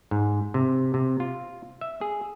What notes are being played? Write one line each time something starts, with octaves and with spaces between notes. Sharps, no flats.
G#2
C3
C3
F4
E5
G#4